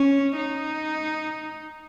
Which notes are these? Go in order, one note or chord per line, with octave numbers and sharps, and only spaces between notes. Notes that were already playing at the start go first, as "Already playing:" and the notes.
Already playing: C#4
D#4